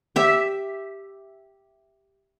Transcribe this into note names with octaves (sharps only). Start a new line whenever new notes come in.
G4 E5